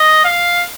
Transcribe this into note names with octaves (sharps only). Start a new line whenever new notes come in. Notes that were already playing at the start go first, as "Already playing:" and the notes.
Already playing: D#5
F5